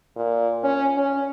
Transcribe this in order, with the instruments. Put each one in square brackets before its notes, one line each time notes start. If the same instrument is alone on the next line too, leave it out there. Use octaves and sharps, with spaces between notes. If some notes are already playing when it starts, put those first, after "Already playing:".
[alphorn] A#2
C#4
C#4